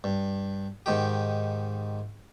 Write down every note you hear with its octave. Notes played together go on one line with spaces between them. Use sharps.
G2
G#2 D#3 G4